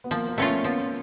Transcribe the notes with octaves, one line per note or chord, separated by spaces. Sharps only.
B3
F3 A#3
A#3
A3 B3 C#4 F4
F3 B3